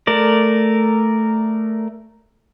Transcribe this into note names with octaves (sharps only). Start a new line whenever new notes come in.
A3 A#4 D5